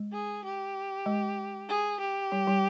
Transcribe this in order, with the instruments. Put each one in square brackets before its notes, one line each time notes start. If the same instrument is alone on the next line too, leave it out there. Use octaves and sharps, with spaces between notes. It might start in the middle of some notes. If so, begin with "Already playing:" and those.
Already playing: [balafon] G#3
[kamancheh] G#4
G4
[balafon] G#3
[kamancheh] G#4
G4
[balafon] G3
G3